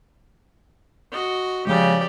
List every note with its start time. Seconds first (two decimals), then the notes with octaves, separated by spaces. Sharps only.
1.12 F#4 D#5
1.67 C#3 F3 G#3 G4 D5